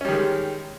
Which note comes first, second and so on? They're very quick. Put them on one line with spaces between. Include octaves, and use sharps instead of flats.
C#4 G3 D#3 G#3